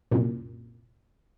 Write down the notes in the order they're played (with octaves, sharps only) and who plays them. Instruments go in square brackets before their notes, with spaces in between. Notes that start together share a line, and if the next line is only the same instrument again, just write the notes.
[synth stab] C2 F#2 A#2